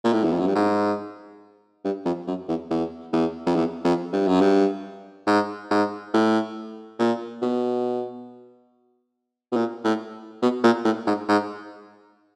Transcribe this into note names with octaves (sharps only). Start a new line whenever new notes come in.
A#2
A2
E2
F2
F#2
G2
G#2
G2
F2
F#2
E2
E2
E2
F2
E2
F2
G2
F#2
G2
G#2
G#2
A2
A#2
B2
B2
A#2
A2
B2
A#2
A2
G#2
G#2